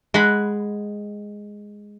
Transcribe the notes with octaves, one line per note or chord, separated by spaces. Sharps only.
G#3 F#5 B5